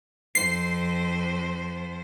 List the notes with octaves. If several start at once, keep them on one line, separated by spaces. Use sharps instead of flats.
F2 C5 C7